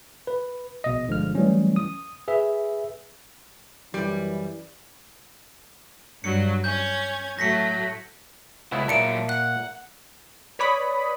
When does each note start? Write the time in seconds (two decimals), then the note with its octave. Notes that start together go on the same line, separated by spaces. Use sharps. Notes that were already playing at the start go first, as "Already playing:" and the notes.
0.27 B4
0.84 A#1 B2 D#5
1.08 G1 D3 F3 G#3 F6
1.35 E3 F#3 G3 A3 C#4
1.76 D#6
2.28 G#4 B4 E5
3.94 F#2 E3 G3
6.24 G2 F#3 C#7
6.64 C#4 G6 G#6
7.39 A2 F#3 A3 A#6 B6 C#7
8.72 C#2 C#3 B3 E4
8.88 A#2 F#3 E5 A5 C#7 D7
9.29 F#5 F#6
10.59 B4 C#5 D5 B5 D#6